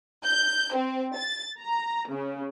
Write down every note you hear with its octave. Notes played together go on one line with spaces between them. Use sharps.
G6
C4
A6
A#5
C#3